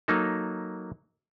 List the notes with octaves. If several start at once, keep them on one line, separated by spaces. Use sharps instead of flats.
F#3 A#3 D#4 A4